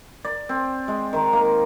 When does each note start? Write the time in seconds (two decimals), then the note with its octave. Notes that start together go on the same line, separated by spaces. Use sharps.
0.24 D5
0.49 C4
0.88 G#3
1.13 D#3
1.33 A#3